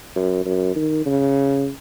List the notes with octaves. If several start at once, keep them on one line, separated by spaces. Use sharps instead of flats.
F#2
F#2
D#3
C#3